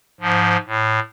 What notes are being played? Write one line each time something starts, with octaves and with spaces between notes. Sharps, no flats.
G#2 F3
A2